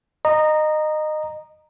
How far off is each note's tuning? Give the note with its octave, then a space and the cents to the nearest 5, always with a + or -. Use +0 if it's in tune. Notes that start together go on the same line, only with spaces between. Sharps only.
D#5 -20 A#5 +0